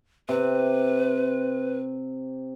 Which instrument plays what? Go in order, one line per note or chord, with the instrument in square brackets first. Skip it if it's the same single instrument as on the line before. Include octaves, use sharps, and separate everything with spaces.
[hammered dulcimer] C3 [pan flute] B4